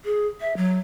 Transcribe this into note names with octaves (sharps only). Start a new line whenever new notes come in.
G#4
E5
F#3